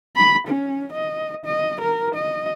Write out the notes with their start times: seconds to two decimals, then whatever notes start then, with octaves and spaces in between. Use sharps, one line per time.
0.17 B5
0.48 C#4
0.92 D#5
1.46 D#5
1.81 A#4
2.15 D#5